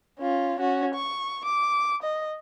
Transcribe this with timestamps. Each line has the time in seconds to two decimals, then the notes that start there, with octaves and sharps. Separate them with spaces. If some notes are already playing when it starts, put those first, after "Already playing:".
0.20 C#4 F4
0.59 C#4 F#4
0.94 C#6
1.45 D6
2.02 D#5